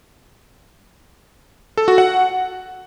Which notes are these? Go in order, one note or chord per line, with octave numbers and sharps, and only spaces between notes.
A4
F#4
F#5